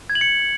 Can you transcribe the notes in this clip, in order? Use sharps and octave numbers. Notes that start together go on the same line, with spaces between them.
G#6
F#7
C#7